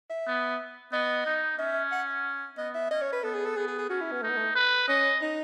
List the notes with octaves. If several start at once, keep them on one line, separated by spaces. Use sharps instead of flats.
E5
B3
B3 D#5
D#4
C#4 E5
F#5
B3 D#5
E5
C#4 D#5
C#5
B4
B3 A4
G#4
A4
B3 G#4
G#4
G#4
C#4 F#4
E4
B3
A3 D#4
B3
A3
B4
C#4 D#5
D#4